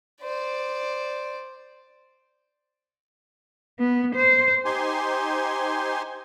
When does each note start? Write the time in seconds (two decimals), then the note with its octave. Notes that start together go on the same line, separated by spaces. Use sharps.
0.22 C5 D5
3.79 B3
4.15 C5
4.65 D#4 G4 C5 G#5 C6